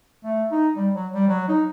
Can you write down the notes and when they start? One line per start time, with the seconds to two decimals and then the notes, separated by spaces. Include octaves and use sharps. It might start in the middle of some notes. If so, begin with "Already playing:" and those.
0.24 A3
0.51 D#4
0.76 G3
0.95 F#3
1.13 G3
1.28 F#3
1.48 D#4